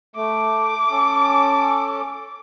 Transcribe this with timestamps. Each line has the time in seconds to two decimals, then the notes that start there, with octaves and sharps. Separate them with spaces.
0.16 A3 D6
0.91 C#4 A4